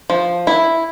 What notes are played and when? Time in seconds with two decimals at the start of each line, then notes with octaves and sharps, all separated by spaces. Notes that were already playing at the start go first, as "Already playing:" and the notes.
0.10 F3
0.47 E4